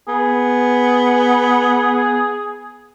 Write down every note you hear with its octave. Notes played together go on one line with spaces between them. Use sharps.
B3 G#4